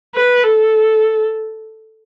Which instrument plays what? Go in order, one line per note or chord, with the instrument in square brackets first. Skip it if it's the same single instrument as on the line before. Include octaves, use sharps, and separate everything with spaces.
[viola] B4
A4